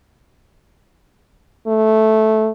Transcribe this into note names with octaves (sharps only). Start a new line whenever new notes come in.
A3